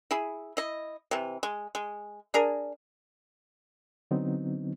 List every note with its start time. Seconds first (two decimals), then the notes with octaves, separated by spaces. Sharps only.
0.11 E4 G#4
0.57 E4 D#5
1.11 C3 E3
1.43 G#3
1.75 G#3
2.34 D4 G#4 A#4
4.11 D3 F#3 B3 C4 D#4